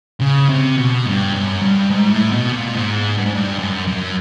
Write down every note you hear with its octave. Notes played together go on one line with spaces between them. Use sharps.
C#3
C3
B2
G2
F#2
G2
G#2
A2
B2
A#2
G#2
G2
G#2
G2
F#2
F#2